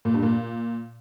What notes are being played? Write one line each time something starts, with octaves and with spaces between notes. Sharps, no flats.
A#2
G2
A#2